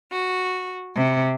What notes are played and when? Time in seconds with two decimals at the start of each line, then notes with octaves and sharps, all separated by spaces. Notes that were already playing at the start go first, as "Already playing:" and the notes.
0.11 F#4
0.96 C3